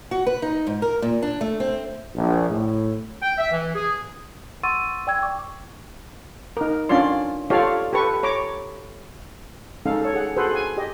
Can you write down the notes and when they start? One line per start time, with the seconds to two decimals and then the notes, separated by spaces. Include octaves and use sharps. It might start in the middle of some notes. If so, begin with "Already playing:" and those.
0.11 F#4
0.26 B4
0.42 D#4
0.67 G#2
0.82 A#4
1.02 A#2
1.22 D4
1.41 A3
1.60 C4
2.15 A#1
2.50 A2
3.22 G5
3.38 E5
3.52 E3
3.75 G#4
4.63 F#5 C6 C#6 E6 A6 D#7
5.07 D5 G5 E6 G#6
5.22 G5 C#6 D6
6.57 D#4 A#4
6.89 C#4 D4 F4 D5 C6
7.50 F4 G4 A4 C#5 D5 F5
7.93 G4 A4 B4 C#6
8.23 C#5 A#5 D6
9.86 G#3 C#4 D#4 A4 F5
10.02 A4 C#5
10.14 G#4 F#5
10.36 F#4 G#4 A4 B4 C5
10.51 G#4 G#5
10.77 G4 D#5